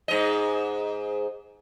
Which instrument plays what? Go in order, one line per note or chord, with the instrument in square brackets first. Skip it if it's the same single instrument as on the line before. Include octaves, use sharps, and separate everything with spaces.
[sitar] G#2 D#5